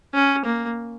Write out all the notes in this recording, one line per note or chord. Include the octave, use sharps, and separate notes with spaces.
C#4
A#3